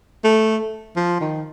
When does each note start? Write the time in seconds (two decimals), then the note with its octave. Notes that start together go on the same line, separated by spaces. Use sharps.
0.24 A3
0.96 F3
1.20 D#3